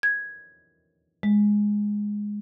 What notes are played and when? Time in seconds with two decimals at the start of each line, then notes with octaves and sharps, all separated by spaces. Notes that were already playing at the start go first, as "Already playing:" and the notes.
0.03 G#6
1.23 G#3